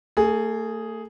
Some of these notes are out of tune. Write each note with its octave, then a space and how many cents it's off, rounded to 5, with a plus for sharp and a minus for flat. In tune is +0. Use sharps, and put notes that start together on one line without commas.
A3 +35 G#4 +0